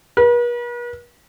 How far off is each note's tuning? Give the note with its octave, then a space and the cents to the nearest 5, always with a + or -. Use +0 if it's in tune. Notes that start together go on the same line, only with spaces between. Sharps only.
B4 -45